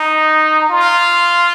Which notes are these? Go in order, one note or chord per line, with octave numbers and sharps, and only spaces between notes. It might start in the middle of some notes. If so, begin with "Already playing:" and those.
Already playing: D#4
F4